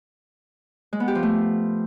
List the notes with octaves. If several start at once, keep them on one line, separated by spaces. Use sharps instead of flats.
G#3
B3
G4
F3
A3